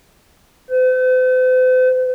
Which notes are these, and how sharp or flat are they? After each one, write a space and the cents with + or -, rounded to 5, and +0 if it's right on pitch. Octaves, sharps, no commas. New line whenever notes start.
C5 -45